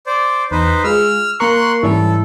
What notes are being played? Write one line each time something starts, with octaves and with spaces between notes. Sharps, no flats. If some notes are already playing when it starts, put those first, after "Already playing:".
C5 D5
E2 D#4 B4 C5
G#3 F4 G#4 E6 F6
A#3 A#4 A#5 C6 C#6 F#6 C#7
G#2 E3 G3 C#4 E4 A4